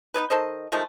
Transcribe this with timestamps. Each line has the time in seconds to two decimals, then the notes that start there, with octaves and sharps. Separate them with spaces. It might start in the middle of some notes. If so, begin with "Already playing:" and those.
0.14 B3 D#4 G#4 B4
0.30 D#3 A4 C5 D#5
0.72 D#3 F3 G#3 A3